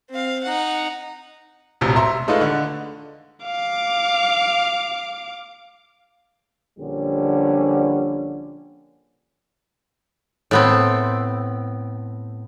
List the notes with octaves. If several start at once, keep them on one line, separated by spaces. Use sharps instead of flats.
C4 F5
D#4 F#5
E1 A1 C3
E5 A#5 C6
G#3 A3 D#4 F4 B4
D3
F5 D6
A#1 D3 G3 C#4
A2 B3 C4